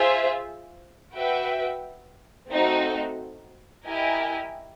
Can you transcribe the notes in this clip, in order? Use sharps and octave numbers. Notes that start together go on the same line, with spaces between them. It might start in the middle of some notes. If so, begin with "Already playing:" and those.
Already playing: F4 G#4 C5 E5
F#4 B4 E5 G5
A3 C4 D#4 F#4
E4 G4 A#4 D#5 G#5